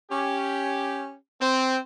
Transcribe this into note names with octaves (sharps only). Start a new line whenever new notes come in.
C#4 G4
C4